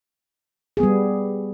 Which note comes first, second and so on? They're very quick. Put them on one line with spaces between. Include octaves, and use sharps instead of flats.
G#4 B3 G3